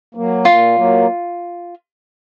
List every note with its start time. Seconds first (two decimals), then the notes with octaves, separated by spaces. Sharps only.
0.15 F#3 A#3
0.45 A#2 F4
0.76 F#3 A#3